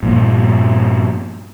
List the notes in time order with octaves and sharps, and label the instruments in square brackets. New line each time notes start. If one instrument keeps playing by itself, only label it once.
[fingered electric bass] G2 A#2 F3